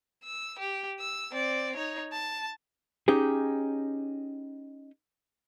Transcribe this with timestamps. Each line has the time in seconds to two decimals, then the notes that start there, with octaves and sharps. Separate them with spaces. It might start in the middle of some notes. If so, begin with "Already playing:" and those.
0.24 E6
0.59 G4
1.00 E6
1.32 C4 D5
1.76 D#4 C#5
2.12 A5
3.08 C#4 D#4 G4 G#4